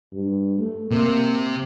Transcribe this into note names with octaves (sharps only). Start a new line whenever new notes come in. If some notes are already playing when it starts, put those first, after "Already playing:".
G2
A3
C3 A#3